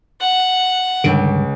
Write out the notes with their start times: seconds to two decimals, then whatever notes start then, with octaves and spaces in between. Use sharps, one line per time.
0.21 F#5
1.04 C#2 G2 D3 D#3 D7